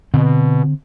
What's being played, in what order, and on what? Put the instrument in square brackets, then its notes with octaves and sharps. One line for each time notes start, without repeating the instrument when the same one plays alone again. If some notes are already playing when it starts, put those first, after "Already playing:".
[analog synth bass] B2 [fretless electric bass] D3 C4